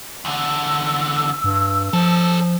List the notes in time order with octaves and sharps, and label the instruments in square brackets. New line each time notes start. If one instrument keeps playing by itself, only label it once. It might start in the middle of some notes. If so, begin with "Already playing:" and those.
[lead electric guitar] E2 D3 [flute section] E6
[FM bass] G2
[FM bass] F3 [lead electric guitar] C#4 A4